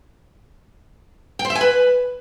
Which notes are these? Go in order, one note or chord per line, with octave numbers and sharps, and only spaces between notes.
G5
C5
E5
G#5
B4